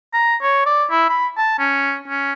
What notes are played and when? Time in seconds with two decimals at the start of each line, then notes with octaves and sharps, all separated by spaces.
0.14 A#5
0.42 C#5
0.66 D5
0.91 E4
1.09 B5
1.38 A5
1.59 C#4
2.08 C#4